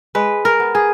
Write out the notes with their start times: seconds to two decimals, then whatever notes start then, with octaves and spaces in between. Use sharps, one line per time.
0.15 G#3 B4
0.45 A#4
0.60 B3
0.75 G#4